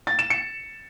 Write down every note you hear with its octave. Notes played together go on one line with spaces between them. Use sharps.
A6
E7
C#7